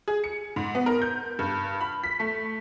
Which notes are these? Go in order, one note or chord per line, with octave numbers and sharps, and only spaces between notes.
G#4
C#7
G#2
B3
A#4
G6
G2
B5
B6
A3